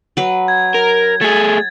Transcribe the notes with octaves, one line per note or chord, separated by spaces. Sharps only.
F#3 B4
G#6
A#4
A3 G#4 A6